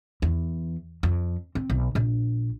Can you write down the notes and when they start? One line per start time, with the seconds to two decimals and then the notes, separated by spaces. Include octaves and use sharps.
0.22 E2
1.03 F2
1.55 C4
1.70 B1
1.95 A#1